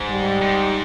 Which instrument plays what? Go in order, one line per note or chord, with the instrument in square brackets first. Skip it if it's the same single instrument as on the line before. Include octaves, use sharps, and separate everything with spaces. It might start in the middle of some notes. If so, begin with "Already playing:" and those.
Already playing: [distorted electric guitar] G#2
[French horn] G3
[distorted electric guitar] G#2